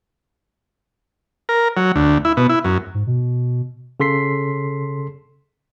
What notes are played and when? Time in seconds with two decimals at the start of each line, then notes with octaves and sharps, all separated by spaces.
1.49 A#4
1.77 F#3
1.96 D2
2.25 E4
2.37 B2
2.49 E4
2.65 F#2
2.94 G#2
3.07 B2
4.00 C#3 A4 C6 B6 C7